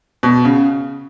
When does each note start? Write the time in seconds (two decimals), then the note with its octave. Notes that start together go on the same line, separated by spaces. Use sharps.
0.23 B2
0.45 C#3